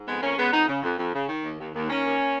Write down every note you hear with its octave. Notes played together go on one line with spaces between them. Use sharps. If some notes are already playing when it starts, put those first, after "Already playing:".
Already playing: G#2
F2 G#3 B3
F2 A#3 C#4
C#3 G#3 B3
F2 B3 D#4
C#3
F2
F2
C#3
D#3
D#2
D#2
D#2
D#3 A#3 C#4
D#2